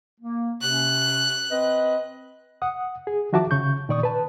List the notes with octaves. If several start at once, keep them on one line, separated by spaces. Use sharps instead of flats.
A#3
C3 C#4 F#6
C4 B4 D#5
F#5 D#6
G#4
D#3 F3 F#4 E5 A5 D6
C#3 C#6 G6
A#2 D#3 D5 C#6 D#6
B4 A5